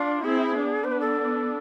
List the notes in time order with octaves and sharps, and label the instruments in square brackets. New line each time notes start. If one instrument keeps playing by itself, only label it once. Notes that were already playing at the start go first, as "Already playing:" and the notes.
Already playing: [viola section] D4 [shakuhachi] F4
[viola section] C4 E4 [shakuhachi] G#4
[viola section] B3 D4
[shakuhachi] C5
B4
A4